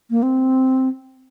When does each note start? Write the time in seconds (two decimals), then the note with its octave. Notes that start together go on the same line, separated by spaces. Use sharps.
0.11 A#3
0.23 C4